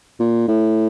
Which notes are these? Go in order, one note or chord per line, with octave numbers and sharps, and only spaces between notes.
A#2
A2